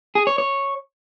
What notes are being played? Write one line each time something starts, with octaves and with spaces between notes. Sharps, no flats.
G#4
C#5
C#5